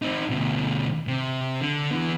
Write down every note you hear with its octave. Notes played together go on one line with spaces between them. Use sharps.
C4 D#4
D2 B2
C3
D3
E3 B3